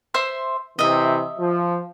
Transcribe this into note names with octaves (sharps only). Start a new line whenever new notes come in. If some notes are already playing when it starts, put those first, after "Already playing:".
C5 E5 C6
C3 E3 D#5 E5
F3